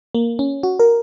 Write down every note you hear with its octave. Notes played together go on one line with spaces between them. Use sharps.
A#3
C#4
F#4
A#4